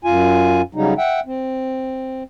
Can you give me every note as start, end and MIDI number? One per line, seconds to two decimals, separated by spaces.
0.04 0.62 42
0.04 0.62 65
0.04 0.62 80
0.75 0.94 49
0.75 0.94 54
0.75 0.94 55
0.75 0.94 63
0.98 1.20 76
0.98 1.20 78
0.98 1.20 79
1.26 2.23 60